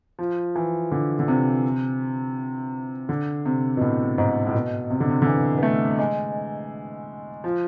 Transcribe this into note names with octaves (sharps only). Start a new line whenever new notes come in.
F3
E3
D3
D3
C3
D3
C3
B2
A2
G#2
A2
B2
C3
D3
C3
D3
E3
B3
A3
G#3
F3